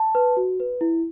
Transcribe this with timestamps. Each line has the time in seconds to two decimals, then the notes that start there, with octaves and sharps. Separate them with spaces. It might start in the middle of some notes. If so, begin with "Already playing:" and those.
Already playing: A5
0.15 B4
0.37 F#4
0.60 B4
0.81 E4